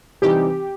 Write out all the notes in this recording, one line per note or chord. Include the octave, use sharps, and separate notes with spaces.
C3 E3 G3 C4 D#4 G4